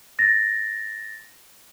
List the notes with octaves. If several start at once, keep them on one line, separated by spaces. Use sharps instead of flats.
A6 A#6